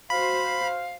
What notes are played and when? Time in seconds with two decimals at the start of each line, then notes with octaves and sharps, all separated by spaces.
0.10 F#4 C5 F5 B5